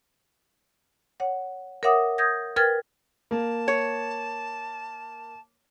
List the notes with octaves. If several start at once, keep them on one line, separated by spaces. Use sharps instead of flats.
C#5 F#5
A#4 C#5 E5 F#5 D6 D#6
D#6 G6 G#6 A#6
A#4 B4 G5 F6 G#6 A6
A#3 A5
C#5